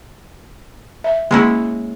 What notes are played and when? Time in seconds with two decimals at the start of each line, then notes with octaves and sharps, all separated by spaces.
1.04 E5
1.31 G#3 A#3 C#4 E4